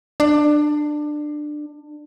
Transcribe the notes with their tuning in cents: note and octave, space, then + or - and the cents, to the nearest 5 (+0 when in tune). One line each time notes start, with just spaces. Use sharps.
D4 +20